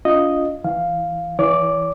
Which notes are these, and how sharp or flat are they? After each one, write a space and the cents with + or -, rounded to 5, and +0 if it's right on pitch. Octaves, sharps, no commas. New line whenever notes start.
D4 -45 F4 +0 D#5 +0
E3 +0 F5 +0
E3 +0 C#5 +40 D6 +0